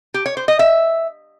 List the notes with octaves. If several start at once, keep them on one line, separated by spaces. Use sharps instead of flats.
G4
C#5
C5
D#5
E5